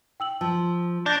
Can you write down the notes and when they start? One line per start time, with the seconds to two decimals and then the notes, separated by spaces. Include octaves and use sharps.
0.20 G5 E6 F#7
0.41 F3 A5 E6
1.06 D4 G6 A6 A#6